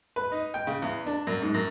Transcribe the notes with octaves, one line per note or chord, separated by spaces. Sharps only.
B4
D#4
G5
C#3
E2
D4
F#2
G#2
F#2